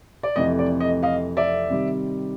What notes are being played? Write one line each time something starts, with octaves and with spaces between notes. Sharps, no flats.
D5
F2 C3 E3 A3 D#5
D5
D#5
D#5 F5
D5 E5
C3 D#3 G3